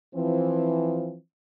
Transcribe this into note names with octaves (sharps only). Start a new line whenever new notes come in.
E3 F3 C4